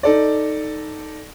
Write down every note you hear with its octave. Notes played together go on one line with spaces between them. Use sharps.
D#4 A4 D5